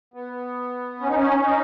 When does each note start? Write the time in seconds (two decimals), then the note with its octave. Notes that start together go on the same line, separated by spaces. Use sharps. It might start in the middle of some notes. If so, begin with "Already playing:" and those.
0.14 B3
1.00 C#4
1.08 D#4
1.16 C#4
1.43 D#4